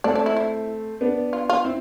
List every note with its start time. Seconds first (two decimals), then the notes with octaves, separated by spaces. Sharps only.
0.04 A3 C4 D4
0.15 D4
0.26 E4
0.36 E4
1.01 B3 D4
1.33 F4
1.50 F4
1.65 C4 E4